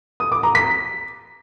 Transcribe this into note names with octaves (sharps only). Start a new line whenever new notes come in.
D#6
D6
A#5
B6